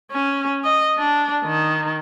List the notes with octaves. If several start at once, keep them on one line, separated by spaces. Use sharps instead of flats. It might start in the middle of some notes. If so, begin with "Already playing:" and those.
C#4
D#5
D4
D#3